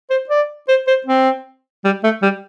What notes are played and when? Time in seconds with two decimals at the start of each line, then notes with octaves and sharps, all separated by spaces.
0.10 C5
0.29 D5
0.68 C5
0.87 C5
1.06 C4
1.84 G3
2.04 A3
2.22 G3